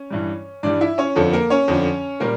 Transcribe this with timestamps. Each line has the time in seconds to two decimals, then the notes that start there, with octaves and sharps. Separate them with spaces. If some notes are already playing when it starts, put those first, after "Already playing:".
Already playing: C#4 C#5
0.10 G2 E3 G3
0.63 G2 E3 G3 D4 D5
0.81 E4 E5
0.98 C#4 C#5
1.15 F2 D3 F3 A4
1.33 A#3 A#4
1.50 C#4 C#5
1.68 F2 D3 F3
2.20 A#2 G3 A#3 A#4